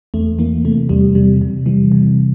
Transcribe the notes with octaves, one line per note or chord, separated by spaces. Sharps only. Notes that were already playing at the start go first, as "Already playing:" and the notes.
E2 A3
E3 A#3
C3 A3
E2 G3
C3 G3
C3
E3 G3
C3